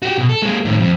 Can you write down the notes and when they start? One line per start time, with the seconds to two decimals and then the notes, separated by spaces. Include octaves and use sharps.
0.02 F#4 G4
0.18 B2
0.29 A4
0.42 G#3 A#3
0.65 A2 D#3
0.80 F2